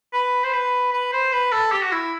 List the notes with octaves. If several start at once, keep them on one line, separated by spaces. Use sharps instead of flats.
B4
C5
B4
B4
C5
B4
A4
G4
F#4
E4